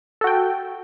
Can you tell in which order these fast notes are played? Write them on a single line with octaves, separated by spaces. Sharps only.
A4 F#4 G5